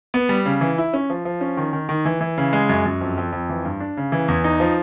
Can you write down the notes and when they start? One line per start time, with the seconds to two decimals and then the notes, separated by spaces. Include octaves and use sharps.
0.14 B3
0.29 G3
0.46 C#3
0.61 E3
0.78 E4
0.93 C#4
1.10 F3
1.25 F3
1.41 C#4
1.57 D#3
1.73 D#3
1.89 D#3
2.05 E3
2.21 E3
2.38 C#3
2.53 G#3
2.69 F#2
2.85 F#2
3.01 F2
3.18 F2
3.32 F2
3.49 E3
3.65 G2
3.80 D4
3.97 C#3
4.12 E3
4.28 E2
4.44 D#4
4.60 F3